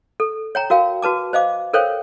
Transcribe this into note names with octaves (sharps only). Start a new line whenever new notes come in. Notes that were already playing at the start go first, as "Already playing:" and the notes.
A4
C#5 G5 A#5
F#4 A#4 F5 G5
F#4 B4 A5 D6
C5 D#5 F5 D6
A4 A#4 C5 C#5 F5 G5